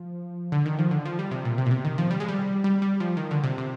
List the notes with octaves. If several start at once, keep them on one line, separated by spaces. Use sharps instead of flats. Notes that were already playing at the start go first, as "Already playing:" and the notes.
Already playing: F3
D3
D#3
F3
D3
F3
G3
C3
A#2
C3
A#2
C3
D#3
F3
G3
G#3
G3
G3
G3
F3
D#3
D3
C3
C3